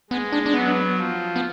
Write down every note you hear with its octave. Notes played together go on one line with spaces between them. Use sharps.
G#3 B3
D4
D4
F#3 B3
F3
B3